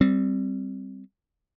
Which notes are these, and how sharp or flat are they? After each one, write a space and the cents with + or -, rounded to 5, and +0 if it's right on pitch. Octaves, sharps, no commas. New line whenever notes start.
G3 +0 C4 +0